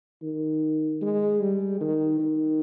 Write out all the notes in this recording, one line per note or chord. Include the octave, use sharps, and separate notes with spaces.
D#3
G#3
G3
D#3
D#3